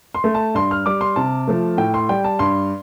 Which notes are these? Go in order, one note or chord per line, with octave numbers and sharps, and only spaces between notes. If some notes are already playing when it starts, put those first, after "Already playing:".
C6
A3
A5
G2 C6
F6
G3 D6
C6
C3 A5
F3 A3
A2 G5
C6
G3 G5
A5
G2 C6